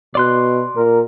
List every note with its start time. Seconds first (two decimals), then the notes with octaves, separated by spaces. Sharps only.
0.15 B2 D5 C6 F#6
0.76 A#2 A#4